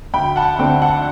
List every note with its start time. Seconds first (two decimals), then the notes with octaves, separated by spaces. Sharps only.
0.14 D2 G5 B5
0.36 F#5 A5
0.58 D3 A3 C4 G5
0.82 F#5 A5